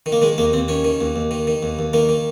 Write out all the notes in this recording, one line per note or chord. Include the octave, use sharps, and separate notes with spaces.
D#3
A#3
D#3 G#3
D#2 A#3
D#2 C4
D#3 C#4
D#3
D#2
D#2
D#3
D#3
D#2
D#2
D#3 A#3
D#3